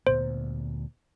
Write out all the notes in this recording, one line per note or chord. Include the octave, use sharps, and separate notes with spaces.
D2 A#2 B3 C5